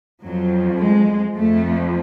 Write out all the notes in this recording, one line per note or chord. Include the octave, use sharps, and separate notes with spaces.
F2 F3 F#3
G#3
F2 F3 A3